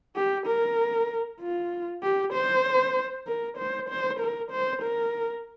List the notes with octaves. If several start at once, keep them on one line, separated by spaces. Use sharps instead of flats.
G4
A#4
F4
G4
C5
A#4
C5
C5
A#4
C5
A#4